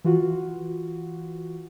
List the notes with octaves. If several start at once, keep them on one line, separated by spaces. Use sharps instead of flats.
E3 F4 F#4